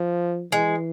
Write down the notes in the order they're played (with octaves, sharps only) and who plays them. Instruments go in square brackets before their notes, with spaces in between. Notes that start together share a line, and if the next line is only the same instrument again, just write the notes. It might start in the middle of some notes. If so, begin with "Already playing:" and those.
Already playing: [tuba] F3
[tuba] E3 [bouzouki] G#3